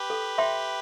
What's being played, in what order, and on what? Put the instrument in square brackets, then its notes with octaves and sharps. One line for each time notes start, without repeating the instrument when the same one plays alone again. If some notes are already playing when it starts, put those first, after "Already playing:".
Already playing: [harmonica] G4 B4
[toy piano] A4
E5 G5 C6